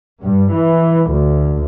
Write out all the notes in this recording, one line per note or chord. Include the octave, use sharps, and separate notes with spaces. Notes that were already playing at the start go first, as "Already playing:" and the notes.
G2
E3
D2